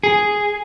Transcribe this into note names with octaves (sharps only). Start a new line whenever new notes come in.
G#4